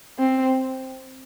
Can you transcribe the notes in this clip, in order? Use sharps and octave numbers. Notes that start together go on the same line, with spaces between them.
C4